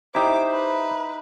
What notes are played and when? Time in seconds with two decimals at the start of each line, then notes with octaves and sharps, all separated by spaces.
0.15 D#4 E4 G4 C5 D#5 E5 D6
0.51 B4